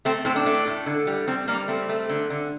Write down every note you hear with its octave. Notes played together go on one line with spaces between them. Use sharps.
A3 C4
A2 C4
D4
A3
A2
D3
G3
G3 C4
G3 A#3
A3 C4
A3
D3
D3